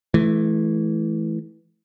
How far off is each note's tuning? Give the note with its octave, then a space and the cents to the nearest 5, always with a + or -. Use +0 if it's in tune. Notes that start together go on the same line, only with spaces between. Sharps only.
E3 +0 A3 -30